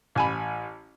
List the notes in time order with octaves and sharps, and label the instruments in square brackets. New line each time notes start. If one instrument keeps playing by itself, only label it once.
[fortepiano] A1 G#5 B5